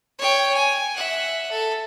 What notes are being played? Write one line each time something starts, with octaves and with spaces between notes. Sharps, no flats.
C#5 G5
G#5
E5 F#5
A4